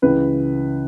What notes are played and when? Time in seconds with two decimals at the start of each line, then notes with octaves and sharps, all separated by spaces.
0.02 C#2 C#3 E3 B4